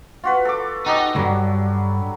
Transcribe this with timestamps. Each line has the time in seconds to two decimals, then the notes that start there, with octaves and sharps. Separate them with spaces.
0.24 F4 F#4 B4
0.45 A4 D6
0.86 D#4 F#4 G4 D#5
1.15 C#2 G2 D3 F#3 G3